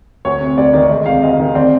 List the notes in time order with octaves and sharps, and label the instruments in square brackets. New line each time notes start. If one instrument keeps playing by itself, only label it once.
[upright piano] D2 [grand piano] C#5
[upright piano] C3
[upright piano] D2 [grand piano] D5
[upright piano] D#3 [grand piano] D5
[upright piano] G#3 [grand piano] D#5
[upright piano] C3 [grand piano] F5
[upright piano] D2 [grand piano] D#5
[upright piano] D#3
[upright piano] C4 [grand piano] D5